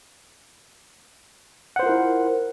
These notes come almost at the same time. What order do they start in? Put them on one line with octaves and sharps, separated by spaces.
F#5 C5 F4 A#4 E4